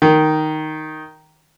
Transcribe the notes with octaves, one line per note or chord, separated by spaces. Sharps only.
D#3